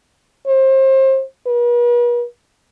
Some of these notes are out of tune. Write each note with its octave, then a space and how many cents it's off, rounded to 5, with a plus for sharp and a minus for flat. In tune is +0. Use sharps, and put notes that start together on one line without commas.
C5 +30
B4 -45